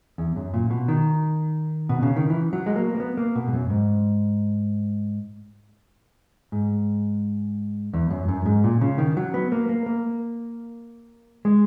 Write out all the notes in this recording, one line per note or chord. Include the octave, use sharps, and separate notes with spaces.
E2
F#2
A#2
B2
D#3
B2
C#3
D#3
E3
F#3
G#3
A#3
A#3
B3
A#3
B2
G#2
F#2
G#2
G#2
E2
F#2
F#2
G#2
A#2
C#3
D#3
F#3
B3
A#3
A#3
A#3
G#3